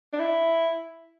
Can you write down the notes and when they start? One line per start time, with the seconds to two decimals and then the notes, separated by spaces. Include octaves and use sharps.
0.13 D4
0.19 E4